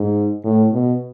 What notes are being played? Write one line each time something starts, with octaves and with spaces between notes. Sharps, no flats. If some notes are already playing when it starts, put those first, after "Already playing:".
Already playing: G#2
A2
B2